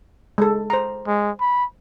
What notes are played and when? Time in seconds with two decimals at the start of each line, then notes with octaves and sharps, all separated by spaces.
0.38 G#3 A4
0.70 C5 A#5
1.07 G#3
1.41 B5